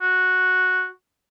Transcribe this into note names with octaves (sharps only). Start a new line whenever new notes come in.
F#4